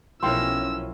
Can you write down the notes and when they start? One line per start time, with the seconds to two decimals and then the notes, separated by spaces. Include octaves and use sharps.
0.23 B1 F3 C#4 E4 A#4 G5 C6 E6